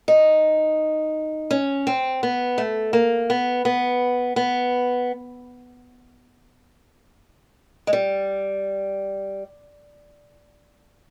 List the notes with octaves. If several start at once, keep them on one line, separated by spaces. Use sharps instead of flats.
D#4
C#4
C4
B3
A3
A#3
B3
B3
B3
G#3
G3